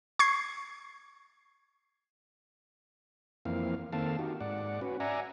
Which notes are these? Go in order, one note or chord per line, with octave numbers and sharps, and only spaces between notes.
C#6 G#6 C7
F2 E3 A#3 C4 F5
D#3 A#3 C4 A4 F5 A5
D#4 F#4 G4
G#2 D5 F#5
C#4 F#4 B4
D5 E5 F#5 G#5 A#5